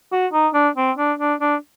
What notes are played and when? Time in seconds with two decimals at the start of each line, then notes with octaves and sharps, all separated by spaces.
0.12 F#4
0.33 D#4
0.54 D4
0.77 C4
0.98 D4
1.19 D4
1.41 D4